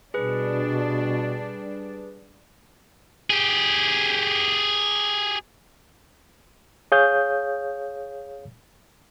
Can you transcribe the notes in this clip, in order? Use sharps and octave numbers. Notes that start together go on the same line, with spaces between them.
B2 G3 D4 G#4 B4
G4 G#4
G#4 C#5 F5 D#6 G6